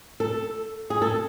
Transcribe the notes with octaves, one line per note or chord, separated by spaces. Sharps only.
A4
G#4
A4